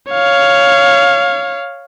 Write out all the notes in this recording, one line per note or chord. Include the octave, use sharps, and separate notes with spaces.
C#5 F5